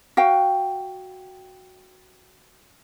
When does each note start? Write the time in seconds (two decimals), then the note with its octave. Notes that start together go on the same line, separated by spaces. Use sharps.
0.17 F#4 F5 G5